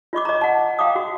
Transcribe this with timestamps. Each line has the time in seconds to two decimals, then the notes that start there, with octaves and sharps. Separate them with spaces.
0.13 F4 D#5 C#6 D6
0.25 D#5 A#5
0.41 F#5 A5
0.79 F5 G5 A#5 D6 D#6
0.96 F#4